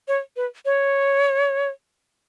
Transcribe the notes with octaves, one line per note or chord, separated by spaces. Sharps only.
C#5
B4
C#5